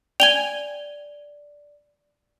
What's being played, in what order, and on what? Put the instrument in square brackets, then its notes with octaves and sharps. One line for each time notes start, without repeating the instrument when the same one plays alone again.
[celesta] D5 [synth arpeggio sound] G5 G#5 [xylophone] F7 G7